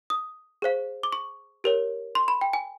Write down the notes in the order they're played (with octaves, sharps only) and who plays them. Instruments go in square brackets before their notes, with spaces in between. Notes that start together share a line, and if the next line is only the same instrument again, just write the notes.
[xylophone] D#6
G#4 C5 F5
D6
C#6
G4 A#4 C#5
C6
B5
G5
G#5